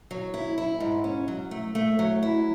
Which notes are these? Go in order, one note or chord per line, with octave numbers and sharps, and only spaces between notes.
F#3
E4
E4
G#2
C#4
F#3
A3
A3
F#3
E4